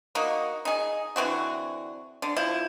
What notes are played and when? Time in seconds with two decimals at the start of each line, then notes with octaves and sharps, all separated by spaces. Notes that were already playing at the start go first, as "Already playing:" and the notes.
0.15 A#3 D#4 F#4
0.65 D#4 G#4
1.16 D3 E3 C4 F#4
2.22 D3
2.36 F3 E4